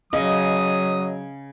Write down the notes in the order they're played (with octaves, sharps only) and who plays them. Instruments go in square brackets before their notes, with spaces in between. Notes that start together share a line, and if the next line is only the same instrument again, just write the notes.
[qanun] C#3 [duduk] F#3 [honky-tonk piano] D#5 [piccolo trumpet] D#6